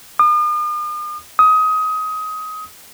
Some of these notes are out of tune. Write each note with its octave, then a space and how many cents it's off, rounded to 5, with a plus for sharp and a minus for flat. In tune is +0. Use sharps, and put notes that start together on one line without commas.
D#6 -45
D#6 +20